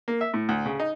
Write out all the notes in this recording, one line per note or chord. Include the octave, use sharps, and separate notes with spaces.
A#3
E5
A2
D2
C#3
D#4